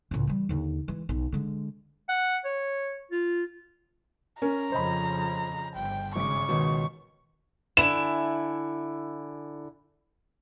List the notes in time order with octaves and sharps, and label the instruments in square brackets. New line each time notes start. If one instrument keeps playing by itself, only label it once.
[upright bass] C#2 A2
E3 G3
D#2 D3
E3 G#3
B1
D3 G#3
[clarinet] F#5
C#5
F4
[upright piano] C#4 A#4 [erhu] A#5
[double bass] F2 C#3 [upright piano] C5 D#5 B5
[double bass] G1 [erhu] G5
[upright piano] G#1 [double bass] C#3 [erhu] C#6 [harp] D6 B6
[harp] C#2 D#3 [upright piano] B2
[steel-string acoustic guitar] D3 E4 G#5 [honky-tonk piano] E7